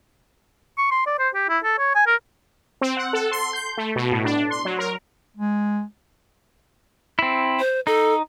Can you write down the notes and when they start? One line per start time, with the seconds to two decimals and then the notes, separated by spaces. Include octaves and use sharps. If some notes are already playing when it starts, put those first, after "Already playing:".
0.78 C#6
0.91 C6
1.06 D5
1.19 C5
1.34 G4
1.49 E4
1.64 A4
1.78 C#5
1.95 G#5
2.07 A#4
2.81 C4
2.97 F#5
3.13 A4
3.32 C6
3.53 G6
3.77 A3
3.96 B2
4.12 A2
4.25 D4
4.50 C6
4.65 F#3
4.78 A#4
5.37 G#3
7.19 C4 E4
7.59 C5
7.87 D#4 A4